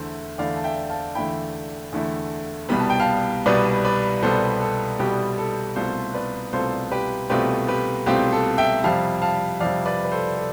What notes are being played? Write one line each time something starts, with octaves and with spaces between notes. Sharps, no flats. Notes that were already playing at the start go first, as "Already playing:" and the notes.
Already playing: E2 D3 A3 E4 C5 E5
E2 D3 A3 E4 D5 F5
A5
E5 G5
F5 A5
E2 D3 A3 E4 G5 B5
E2 D3 A3 E4
C2 B2 G3 B3 B5
A5
G5
F5 A5
C2 B2 G3 B3 B4 D5
B4 D5
C2 B2 G3 B3 A4 C5
A4
C2 B2 G3 B3 G4
A4
C2 B2 A3 C4 F4 A4 C5
B4 D5
C2 B2 A3 C4 F4 A4 C5
G4 B4
C2 B2 A3 C4 F4 G4 B4
G4 B4
C2 B2 A3 C4 F4 G4
A4
E5 G5
F2 C3 G3 F5 A5
F5 A5
F2 C3 G3 D5 F5
B4 D5
B4
A4 C5
A4